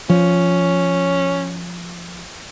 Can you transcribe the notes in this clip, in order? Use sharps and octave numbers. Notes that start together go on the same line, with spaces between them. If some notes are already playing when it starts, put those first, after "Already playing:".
F3 C#4